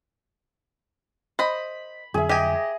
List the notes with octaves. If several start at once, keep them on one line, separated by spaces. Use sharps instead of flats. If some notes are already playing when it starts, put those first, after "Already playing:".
C5 D#5 B5
F2 D3 F#3 G#4 E5
G4 D#5 G#5